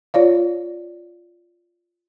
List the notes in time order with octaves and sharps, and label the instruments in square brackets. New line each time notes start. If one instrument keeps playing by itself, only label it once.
[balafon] F4 C#5 D5 F5